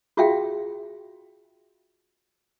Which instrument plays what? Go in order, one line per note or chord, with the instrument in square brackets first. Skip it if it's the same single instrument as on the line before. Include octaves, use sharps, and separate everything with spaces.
[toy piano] F4 F#4 G#4 E5 F5 G5